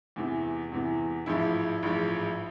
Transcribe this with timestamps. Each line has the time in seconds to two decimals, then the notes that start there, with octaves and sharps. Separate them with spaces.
0.16 E2 C3 E3
0.72 E2 C3 E3
1.26 A1 G#2 F3 E4
1.83 A1 G#2 F3